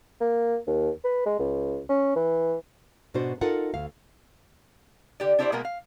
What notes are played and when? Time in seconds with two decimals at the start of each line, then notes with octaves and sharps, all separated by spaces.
0.20 A#3
0.67 D#2
1.04 B4
1.26 G#3
1.39 C#2
1.89 C#4
2.16 E3
3.14 G#2 B2 D4 F#4 C5
3.41 D#4 F4 A4 A#4 F#5
3.74 D2 F5
5.20 D3 G4 D5
5.39 D4 E4 G4 B4 C5 D5
5.52 B2 G#3 A#3 B3 A#4
5.65 F5